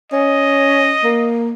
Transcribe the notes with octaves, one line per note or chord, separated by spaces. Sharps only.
C#4 D#5
A#3